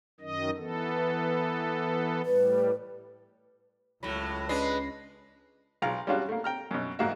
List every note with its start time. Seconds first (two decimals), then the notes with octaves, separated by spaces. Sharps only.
0.20 F#2 D#3 D#5
0.57 E3 B3 A4
2.25 A2 G3 B4
4.03 C#2 A2 F#3 B5
4.49 G#3 C#4 D4 B4 A#6 C7
5.82 B1 G#3 F4 A#5 F6
6.07 G3 G#3 C#4 D4 F4 F#4
6.29 A3 A#3
6.44 G5 A#5 F6
6.71 F#2 B2
6.99 A1 G#2 A#3 F#4 E5